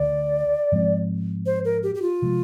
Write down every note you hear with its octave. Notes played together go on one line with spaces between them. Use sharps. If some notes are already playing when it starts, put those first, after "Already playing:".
Already playing: D2 D3 D5
G#2 F3 G#3 C4
C5
A#4
G4
G4
F4
C3 F3 G#3